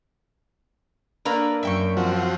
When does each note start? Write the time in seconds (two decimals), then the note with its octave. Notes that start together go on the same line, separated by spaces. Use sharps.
1.25 A3 A#3 D4 A#4 B4
1.63 F#2 E5 G5 C#6
1.97 F3 C4 F#4